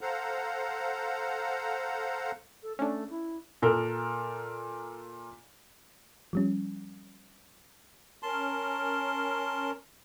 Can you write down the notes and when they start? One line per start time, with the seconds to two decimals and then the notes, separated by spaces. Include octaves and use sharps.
0.01 A4 C5 F5 F#5 A#5
2.63 A4
2.79 A3 C#4 D4
3.10 E4
3.62 A#2 A4 A#4
6.33 F3 G3 C#4
8.22 C#4 A#4 A5 C6